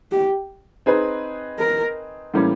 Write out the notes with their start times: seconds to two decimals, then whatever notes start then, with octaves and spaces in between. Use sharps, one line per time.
0.12 G4
0.86 C4 D#4 G#4 B4
1.59 A#4
2.34 A2 E3 G3 A#3 C#4